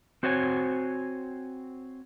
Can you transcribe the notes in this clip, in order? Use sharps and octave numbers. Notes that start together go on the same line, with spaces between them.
C4 F#4 C5 C#5 D#5 G#5